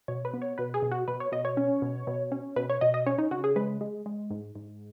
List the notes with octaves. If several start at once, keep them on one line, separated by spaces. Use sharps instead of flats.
B2 C#5
B4
B3
C#5
B2 B4
G#4
B2
F#4
B2 B4
C#5
B2 D#5
C#5
C#4
B2
B2
C#4
B2 B4
C#5
B2 D#5
D#5
C#4 C#5
D#4
C#3 F#4
G#4
G#3 B4
G#3
G#3
G#2
G#2